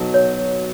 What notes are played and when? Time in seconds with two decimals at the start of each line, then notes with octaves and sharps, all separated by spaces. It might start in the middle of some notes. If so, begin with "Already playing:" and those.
Already playing: B2 F#3 B3 D#4 A4
0.14 C#5